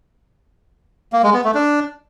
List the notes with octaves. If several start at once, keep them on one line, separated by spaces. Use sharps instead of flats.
A#3
G#3
B3
A3
D4